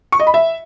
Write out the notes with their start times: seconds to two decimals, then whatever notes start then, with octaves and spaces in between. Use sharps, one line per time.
0.12 C#6
0.20 D#5
0.27 B5
0.34 E5